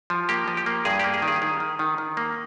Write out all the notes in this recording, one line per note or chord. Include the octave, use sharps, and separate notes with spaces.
F3
A#3 G4
F3
G4
A#3
G2 G#4
A#3 G4
G#4
D#3
G#4
D#3 G#4
D#3
D#3
D#3
A#3